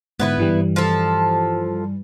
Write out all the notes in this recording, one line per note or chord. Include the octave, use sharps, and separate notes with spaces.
G#2 D3 B3 E4 B4
G2 E3 G3
F3 A4